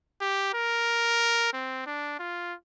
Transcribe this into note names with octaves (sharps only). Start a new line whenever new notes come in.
G4
A#4
C4
D4
F4